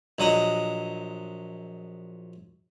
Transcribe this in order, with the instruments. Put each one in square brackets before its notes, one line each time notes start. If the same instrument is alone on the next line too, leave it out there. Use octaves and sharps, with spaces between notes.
[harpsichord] A#1 F#3 D#5